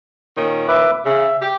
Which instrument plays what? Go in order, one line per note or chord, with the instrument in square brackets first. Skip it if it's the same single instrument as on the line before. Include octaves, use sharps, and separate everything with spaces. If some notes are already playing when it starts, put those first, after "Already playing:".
[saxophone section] A#2 D#3 C#4
[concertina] B4 E5 D6
[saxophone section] C#3 [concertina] E5
[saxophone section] G4